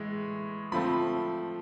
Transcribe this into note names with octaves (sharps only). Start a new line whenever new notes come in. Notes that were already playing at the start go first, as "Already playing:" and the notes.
Already playing: A2 E3 G#3
F3 A3 C4 B5